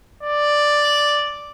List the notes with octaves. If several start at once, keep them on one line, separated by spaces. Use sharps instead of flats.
D5